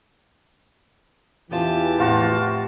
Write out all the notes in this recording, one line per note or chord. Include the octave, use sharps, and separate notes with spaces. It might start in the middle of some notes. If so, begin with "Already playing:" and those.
E2 E3 B3 C#4 F4 G4 A5
A2 C3 F3 F4 F#4